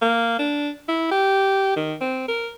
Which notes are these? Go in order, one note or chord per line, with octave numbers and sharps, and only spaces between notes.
A#3
D4
E4
G4
D#3
C4
A#4